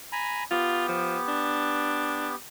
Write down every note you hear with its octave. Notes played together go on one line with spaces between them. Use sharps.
G#5 A#5 B5
B3 F4 G4
F3
D4